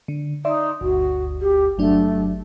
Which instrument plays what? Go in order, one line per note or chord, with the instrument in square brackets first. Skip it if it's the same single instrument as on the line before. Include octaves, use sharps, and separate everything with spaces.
[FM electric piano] D3
[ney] D#4 [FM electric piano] D5 E5 C6
[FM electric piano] G1 D2 [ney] F#4
[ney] G4
[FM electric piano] G1 F#3 D4 [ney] A3